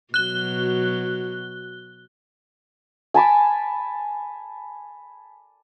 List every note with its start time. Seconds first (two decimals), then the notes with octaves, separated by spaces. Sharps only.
0.14 B2 F#3 F#6 G7
3.14 G#5 A5 B5 D6